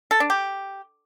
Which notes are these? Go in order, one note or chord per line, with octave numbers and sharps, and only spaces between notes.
A4
D4
G4